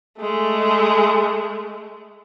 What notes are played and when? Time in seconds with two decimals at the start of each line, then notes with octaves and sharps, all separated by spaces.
0.20 G#3 A3